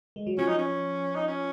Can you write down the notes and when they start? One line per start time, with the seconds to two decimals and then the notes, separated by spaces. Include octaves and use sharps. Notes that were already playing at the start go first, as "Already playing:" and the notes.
0.16 G#3
0.27 F#3
0.38 F3 C#4
0.48 D#4
0.58 C#4
1.15 D#4
1.27 C#4